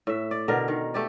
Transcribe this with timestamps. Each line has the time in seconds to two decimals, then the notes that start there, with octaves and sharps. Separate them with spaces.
0.07 A2 E5
0.31 D5
0.48 B2 D3 A#4
0.68 D#3
0.94 A3 G4 D5